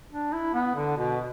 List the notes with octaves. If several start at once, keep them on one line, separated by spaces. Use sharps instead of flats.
D4
E4
B3
D3
B2